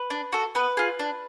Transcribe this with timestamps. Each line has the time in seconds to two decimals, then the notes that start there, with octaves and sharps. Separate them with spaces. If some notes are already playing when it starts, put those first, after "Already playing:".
Already playing: B4
0.10 D4
0.32 F#4 A4
0.55 B3 B4
0.77 F4 G#4
0.99 D4